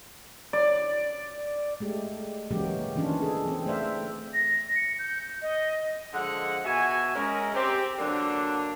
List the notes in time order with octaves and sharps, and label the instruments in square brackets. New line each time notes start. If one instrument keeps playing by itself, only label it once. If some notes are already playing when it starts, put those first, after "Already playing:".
[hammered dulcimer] D5
[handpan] G#3 A3 G4
C#3 E3 F#3 G#3 A#3 G4
D#3 E3 C#4 D4 F4
G#4 A4
E3 C4
A3 C5 D5 E5 F5
[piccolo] A#6
C#7
G6
D#5
[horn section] D3 F3 G#3 F#5
B2 F#4 E5 G#5
G#3 C#4 A#4
C4 G4
D3 F#3 A#3 D4